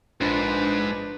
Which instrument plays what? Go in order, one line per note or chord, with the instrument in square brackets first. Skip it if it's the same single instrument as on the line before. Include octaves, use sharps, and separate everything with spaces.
[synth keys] A#1 D4 [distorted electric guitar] G#2 [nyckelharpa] B4